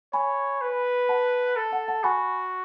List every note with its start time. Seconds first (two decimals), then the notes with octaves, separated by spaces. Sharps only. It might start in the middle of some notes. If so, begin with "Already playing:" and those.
0.13 C#5 G#5 B5
0.61 B4
1.09 F#5 A5
1.56 A4
1.72 F#5 A5
1.88 F#5 A5
2.03 F#4 G#5 B5